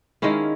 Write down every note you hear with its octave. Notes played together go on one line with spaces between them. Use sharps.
D#3 G#3 C#4 E4 F5